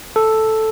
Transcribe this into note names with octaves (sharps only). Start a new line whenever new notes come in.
A4